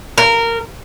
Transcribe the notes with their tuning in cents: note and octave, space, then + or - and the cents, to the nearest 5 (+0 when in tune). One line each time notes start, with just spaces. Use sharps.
A#4 -15